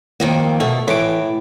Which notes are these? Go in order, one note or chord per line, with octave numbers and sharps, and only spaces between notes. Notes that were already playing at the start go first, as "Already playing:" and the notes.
F2 D#3 A#3
B2 A3
A2 E3 D6